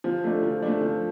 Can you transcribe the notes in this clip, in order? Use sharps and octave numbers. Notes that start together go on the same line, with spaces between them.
F3
A3 D4
F3
A3 D4
F3